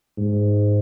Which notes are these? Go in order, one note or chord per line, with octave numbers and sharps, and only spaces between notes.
G#2